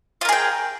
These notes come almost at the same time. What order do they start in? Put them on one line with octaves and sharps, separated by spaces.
F4 A#4 G#4 G5